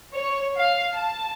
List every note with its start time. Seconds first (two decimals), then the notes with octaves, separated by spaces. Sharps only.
0.14 C#5
0.57 F5
0.94 A5